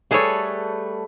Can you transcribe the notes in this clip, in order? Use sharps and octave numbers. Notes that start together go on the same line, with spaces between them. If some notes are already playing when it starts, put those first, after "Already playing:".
G3 A3 G#4 A4 B4 C#5